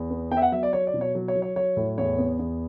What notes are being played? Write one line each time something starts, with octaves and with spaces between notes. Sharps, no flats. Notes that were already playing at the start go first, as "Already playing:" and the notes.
Already playing: E2
B3
B3 G5
E5
F#5
F#3 E5
D5
F#3 C#5
D5
B2
C#5
F#3
C#5
F#3
C#5
F#3 C#5
A2
E2 C#5
B3
E2